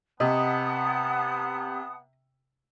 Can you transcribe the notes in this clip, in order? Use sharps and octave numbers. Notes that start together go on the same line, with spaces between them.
C3 B3 D#5 F#5 A5 D#6